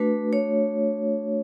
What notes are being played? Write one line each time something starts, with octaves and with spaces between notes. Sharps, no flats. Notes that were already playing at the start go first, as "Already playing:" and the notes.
Already playing: A3 D4 F#4 B4
C#5